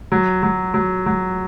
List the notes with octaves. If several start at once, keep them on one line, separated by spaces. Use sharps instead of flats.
F#3
F#3
F#3
F#3